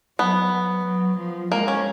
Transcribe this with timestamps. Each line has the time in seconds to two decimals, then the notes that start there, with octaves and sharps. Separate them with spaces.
0.19 F#3 B3
0.52 F#3
0.85 F#3
1.18 F3
1.51 G#3 A#3
1.68 C#4